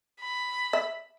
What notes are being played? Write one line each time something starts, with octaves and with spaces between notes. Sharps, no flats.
B5
E5